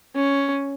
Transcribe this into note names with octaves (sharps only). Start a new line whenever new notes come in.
C#4